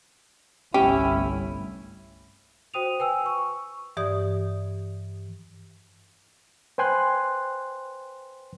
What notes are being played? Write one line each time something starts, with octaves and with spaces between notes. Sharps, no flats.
G1 C2 A3 C#4 E4 G4
F#4 C5 G5 D#6 D#7 F7
B4 G5 G#5 E6
C#6
G2 E3 G4 D5 D#6
B4 C5 G5 G#5 C6 F#6